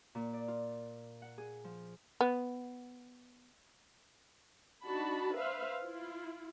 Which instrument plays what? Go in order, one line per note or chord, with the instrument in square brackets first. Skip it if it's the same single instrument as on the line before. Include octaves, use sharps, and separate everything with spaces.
[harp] A#2
D5
F4
F#5
G#4
F3
[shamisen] B3
[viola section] D4 D#4 F#4 A5 B5
B4 C5 E5 F5
E4 F4